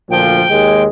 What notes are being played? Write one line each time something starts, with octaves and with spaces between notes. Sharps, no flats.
D2 A#2 F3 G5
D#2 G#3